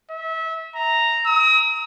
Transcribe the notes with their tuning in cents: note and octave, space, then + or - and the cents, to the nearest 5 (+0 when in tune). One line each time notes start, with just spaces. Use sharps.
E5 -25
A#5 -5
D#6 +40